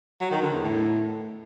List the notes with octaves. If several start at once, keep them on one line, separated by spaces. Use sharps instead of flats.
F#3
D#3
D3
E2
A2